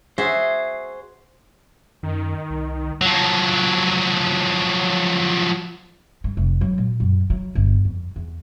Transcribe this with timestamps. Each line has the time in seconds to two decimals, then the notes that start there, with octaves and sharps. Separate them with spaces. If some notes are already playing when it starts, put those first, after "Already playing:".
0.18 F#4 G#4 C5 E5
2.03 F#2 D#3
2.50 C2
3.01 F3 F#3
6.24 G2
6.37 F1
6.61 F#3
6.78 A#2
7.00 F#2
7.30 F#3
7.55 G1
7.85 F2
8.16 E2